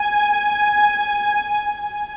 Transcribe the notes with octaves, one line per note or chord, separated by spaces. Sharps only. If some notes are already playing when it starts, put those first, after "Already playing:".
Already playing: G#5